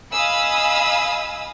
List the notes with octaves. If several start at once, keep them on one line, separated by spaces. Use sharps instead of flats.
D#5 F5 G#5 B5 D#6 E6